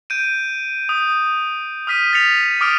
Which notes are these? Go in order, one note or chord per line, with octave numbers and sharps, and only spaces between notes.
G6 D7 D#7
D#6
D#6 F6 B6 D#7
A6 B6 C#7 F7
D6 D#6 F6 D7 D#7